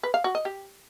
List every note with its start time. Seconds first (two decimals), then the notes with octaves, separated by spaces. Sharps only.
0.03 B4
0.14 F5
0.24 F#4
0.35 D#5
0.45 G4